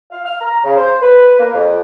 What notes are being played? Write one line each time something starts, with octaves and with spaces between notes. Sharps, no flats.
F5
F6
A#5
C#3
C5
B4
A#3
F2